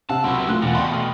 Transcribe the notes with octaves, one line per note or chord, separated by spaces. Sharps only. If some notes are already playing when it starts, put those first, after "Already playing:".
C3 F5 F#5 A5 E6
C#2 F#3 C4 E4 F#5 B5
A3 F4 C6 F#6
E1 G2 A#2 F4 F#5 C#7
B2 D5 F5 G5 B5 C6
A3 F6